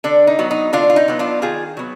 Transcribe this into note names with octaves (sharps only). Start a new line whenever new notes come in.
D3 D4
D#4
F#3 B3
D#4
D3 D4 F4
F4
D#4
F#3 B3
D4 F4
D#3 F4 G#4
F#3 B3